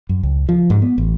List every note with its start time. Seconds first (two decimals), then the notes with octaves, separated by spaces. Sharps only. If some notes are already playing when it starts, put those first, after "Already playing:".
0.09 F#2
0.23 C#2
0.49 F3
0.70 G#2
0.82 B3
0.98 A1